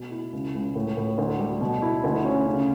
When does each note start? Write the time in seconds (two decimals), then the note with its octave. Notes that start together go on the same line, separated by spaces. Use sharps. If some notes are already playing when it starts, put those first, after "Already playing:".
Already playing: B2
0.11 E4
0.33 C#2
0.55 C#2
0.75 A2
0.97 A2
1.18 D2
1.39 G3
1.61 B2
1.82 E4
2.04 D2
2.25 C#4
2.47 C#3